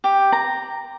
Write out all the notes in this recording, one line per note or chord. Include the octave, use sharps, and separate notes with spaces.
G4
A#5